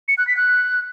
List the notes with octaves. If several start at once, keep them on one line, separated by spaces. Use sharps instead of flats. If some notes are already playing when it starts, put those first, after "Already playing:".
C#7
F#6
B6
F#6